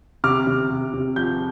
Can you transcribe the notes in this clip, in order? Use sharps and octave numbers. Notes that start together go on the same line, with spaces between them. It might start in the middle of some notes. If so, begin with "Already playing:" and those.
C3 D6 F6
C3
C3
C3
F3 G6